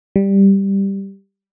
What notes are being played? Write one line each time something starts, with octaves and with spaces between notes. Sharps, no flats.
G3